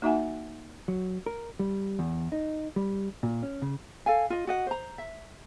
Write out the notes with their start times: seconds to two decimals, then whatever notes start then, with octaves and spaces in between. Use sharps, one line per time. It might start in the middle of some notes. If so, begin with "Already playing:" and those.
0.02 A#3 D#4 F#4 E5 F#5 G#5
0.88 F#3
1.26 A#4
1.59 G3
1.99 E2
2.32 D#4
2.76 G3
3.23 A#2
3.43 C#4
3.62 C#3
4.06 A4 F5 G#5
4.30 F4 D#5
4.47 F#4 D#5 F#5
4.67 C5 A#5
4.98 E5